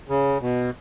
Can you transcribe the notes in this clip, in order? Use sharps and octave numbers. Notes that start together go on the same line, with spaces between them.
C#3
B2